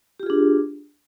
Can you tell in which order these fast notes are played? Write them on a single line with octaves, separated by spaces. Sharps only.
G4 F4 G#4 D4